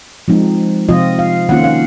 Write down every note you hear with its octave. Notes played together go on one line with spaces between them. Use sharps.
F3 G#3 C4 D#4
C3 F3 C4 F4 D#5
F5
D#3 A#3 C#4 F4 F#5
F5